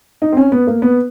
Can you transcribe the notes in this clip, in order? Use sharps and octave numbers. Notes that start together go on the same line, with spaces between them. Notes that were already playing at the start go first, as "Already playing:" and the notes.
D#4
C4
C#4
B3
A#3
B3